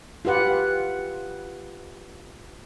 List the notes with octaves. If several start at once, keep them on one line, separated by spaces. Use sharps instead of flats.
F4 G4 B4 F#5